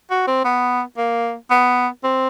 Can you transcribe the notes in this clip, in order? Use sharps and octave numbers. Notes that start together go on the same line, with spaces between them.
F#4
C4
B3
A#3
B3
C4